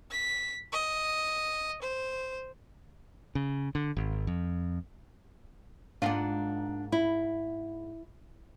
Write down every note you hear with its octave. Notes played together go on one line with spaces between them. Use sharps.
B6
D#5
C5
C#3
D3
G#1
F2
G#2 A#3 D4 F4 F#5
E4